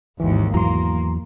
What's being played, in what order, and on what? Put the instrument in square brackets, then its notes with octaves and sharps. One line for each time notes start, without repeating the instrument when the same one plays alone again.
[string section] G#1 D#2 [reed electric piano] E3
[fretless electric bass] E2 E3 F#3 [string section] A#3 [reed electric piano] A#5 C6